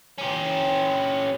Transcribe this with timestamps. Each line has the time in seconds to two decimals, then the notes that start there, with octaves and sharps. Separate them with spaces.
0.18 C#4 G4